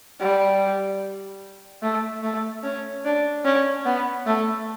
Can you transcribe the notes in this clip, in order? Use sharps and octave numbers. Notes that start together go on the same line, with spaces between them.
G3
A3
A3
C#4
D4
C#4
B3
A3